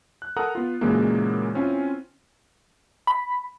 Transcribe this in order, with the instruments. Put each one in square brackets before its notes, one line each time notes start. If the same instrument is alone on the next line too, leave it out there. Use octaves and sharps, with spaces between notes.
[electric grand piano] F#6
A4 A#4 F#5 A#5 D#6 F#6
B3 F4
A#2 C#3 E3 F#3 G#3 A#3
C4 C#4 E4 F4 G#5
[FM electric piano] B5